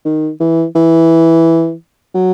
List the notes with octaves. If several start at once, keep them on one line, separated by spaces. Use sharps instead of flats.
D#3
E3
E3
F#3